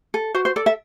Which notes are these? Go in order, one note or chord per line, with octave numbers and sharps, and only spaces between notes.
A4
F#4 C5
C5
A4 D5
E5